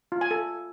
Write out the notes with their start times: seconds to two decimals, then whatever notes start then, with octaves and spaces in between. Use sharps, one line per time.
0.12 F4
0.21 G#5
0.31 A4